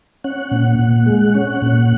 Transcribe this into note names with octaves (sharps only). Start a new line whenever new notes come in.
C#4 F#5
A#2
A#2
G#3
C#4
A#2